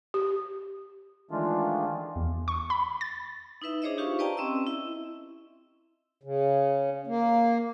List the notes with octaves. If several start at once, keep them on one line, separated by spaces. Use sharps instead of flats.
G4
D#3 E3 G#3 A3 D4 F4
E2
C#6
B5
A6
D#4 E4 B4 E5
D4 G#4 C5 C#5 D#5 E5
D#4 F4 G4 F5 C#6
B4 D5 D#5 G5 A5 A#5
C4 C#4 D#5 E6
E4 E5
C#3
A#3